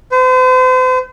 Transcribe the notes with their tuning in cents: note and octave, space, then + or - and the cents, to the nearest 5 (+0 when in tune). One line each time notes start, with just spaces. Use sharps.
C5 -40